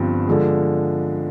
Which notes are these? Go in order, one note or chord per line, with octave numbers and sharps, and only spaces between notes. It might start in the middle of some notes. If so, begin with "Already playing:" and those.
Already playing: G1 G2 F3 C4
D3 F3 G#3